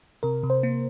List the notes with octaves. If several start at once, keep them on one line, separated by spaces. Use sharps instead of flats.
C3 A#4
C3
C5
A#3